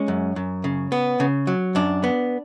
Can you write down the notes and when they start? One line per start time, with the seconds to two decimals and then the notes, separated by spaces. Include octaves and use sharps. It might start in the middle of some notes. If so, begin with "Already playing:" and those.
Already playing: G#3 C#4
0.08 F#2
0.36 F#2
0.64 C#3
0.92 B3
1.20 C#3
1.47 F#3
1.75 F#2 D4
2.04 B3